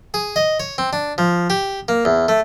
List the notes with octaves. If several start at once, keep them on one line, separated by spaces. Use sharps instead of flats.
G#4
D#5
C#5
C4
D4
F3
G4
A#3
E2
A3